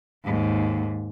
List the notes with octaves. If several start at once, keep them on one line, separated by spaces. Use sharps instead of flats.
D#2 G#2